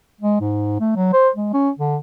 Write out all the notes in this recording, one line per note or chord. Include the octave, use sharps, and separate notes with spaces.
G#3
G#2
A3
F#3
C5
G#3
C#4
D3